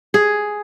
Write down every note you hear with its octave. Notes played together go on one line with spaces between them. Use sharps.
G#4